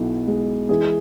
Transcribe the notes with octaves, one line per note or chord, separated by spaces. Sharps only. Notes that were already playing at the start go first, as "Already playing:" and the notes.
Already playing: B1 B2 E4
G#3
E3 G#4